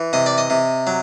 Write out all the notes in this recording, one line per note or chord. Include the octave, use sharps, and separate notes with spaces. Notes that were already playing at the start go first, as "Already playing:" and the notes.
Already playing: E3
C3 D#5
D5
D#5
C3
F#3